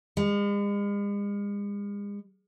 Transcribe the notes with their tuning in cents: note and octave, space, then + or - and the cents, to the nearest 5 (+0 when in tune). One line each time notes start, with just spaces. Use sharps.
G#3 -40